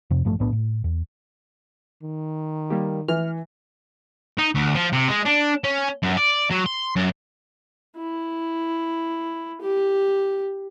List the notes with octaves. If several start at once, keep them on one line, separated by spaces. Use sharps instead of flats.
F2 C3
A1 G2 F3 A3
B1 A2 B3 D4
A2
E2
D#3
G3 A#3 G4
E3 F6
D#4
D2
F3
C3
G#3
D4
C#4
F#2
D5
F#3
C6
F#2
E4
G4